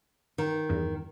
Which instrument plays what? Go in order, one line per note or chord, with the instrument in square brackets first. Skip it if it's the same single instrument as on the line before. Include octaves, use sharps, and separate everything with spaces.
[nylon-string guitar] D#3
[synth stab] E2 G2